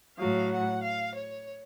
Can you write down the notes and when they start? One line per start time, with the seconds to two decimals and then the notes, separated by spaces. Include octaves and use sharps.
0.17 A2 F#3 F5
0.50 F#5
0.83 F5
1.15 C#5